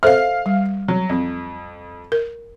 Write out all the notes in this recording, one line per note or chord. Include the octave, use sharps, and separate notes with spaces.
A4 C5 E5 F5 F6
G3
F#3
F2
A#4